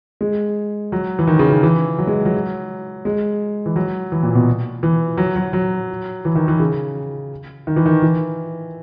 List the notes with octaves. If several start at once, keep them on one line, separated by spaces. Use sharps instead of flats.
G#3
F#3
E3
D#3
C#3
D#3
E3
F#3
G#3
F#3
G#3
E3
F#3
E3
A#2
B2
E3
F#3
F#3
F#3
E3
D#3
E3
C#3
D#3
E3
D#3
E3